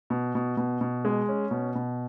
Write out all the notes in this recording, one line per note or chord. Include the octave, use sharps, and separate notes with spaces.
B2
B2
B2
B2
G#3
C#4
B2
B2